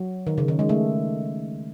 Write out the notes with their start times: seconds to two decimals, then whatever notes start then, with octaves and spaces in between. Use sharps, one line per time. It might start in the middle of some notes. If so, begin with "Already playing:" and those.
Already playing: F#3
0.27 D#3
0.38 C#3
0.48 D#3
0.59 G#3
0.69 A3